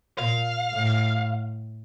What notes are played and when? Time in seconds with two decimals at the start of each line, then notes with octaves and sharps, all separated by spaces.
0.18 A#2 F5
0.73 A2